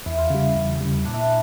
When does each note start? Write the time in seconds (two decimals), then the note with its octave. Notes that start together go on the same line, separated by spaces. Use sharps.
0.06 E2 E4
0.18 F4
0.30 C#3 G3 E4
0.56 E2
0.81 C#3 G3
1.05 A#2 D4
1.13 E4
1.21 D4